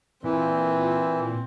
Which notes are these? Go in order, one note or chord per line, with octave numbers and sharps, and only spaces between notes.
A#2 E3 C4